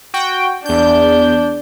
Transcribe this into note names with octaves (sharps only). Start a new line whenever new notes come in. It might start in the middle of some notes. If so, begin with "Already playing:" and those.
F#4 G5
E2 D4 G6